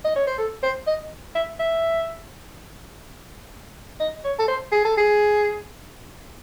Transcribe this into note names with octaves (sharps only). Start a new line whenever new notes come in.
D#5
C#5
C5
A4
C5
D#5
E5
E5
D#5
C#5
A4
C5
G#4
A4
G#4